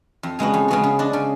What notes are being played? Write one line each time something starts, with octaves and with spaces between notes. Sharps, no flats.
F2
C#3 G#3 B3 F#4
F2
C#3 G#3 B3 F#4
C#3
G#3 D4
C#3